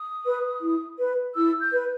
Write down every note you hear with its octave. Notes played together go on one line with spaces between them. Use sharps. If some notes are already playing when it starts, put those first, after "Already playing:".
Already playing: D#6
B4
E4
B4
E4 E6
G6
B4